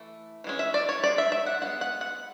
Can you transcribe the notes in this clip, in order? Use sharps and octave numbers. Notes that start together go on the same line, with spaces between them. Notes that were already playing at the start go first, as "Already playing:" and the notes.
Already playing: E3 A3
E3 G#3 C#4
E5
D5
C#5
G#3 C#4 D5
E5
E5
F#5
G#3 B3 D4 F#5
F#5
F#5